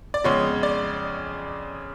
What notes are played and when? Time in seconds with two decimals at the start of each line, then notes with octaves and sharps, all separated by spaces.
0.14 D5
0.24 F2 C#3 G#3 B3 C#5
0.63 D5